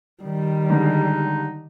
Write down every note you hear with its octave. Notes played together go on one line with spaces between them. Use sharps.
D#3 G3
D3 G#3 D4 D#4